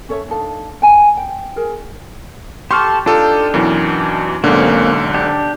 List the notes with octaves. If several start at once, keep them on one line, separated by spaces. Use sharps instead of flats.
C#4 A4 C#5 E5
D4 D#4 A4 F5
G5 G#5 A#5
G5
G#4 A#4
G4 A4 C6 C#6 F6
D4 D#4 F4 G4 A4
F#2 B2 E3
B1 G#2 D3 A#3 C4 C#4
D4 G4